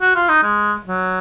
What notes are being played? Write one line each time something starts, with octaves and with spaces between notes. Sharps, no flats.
F#4
F4
D#4
G#3
F#3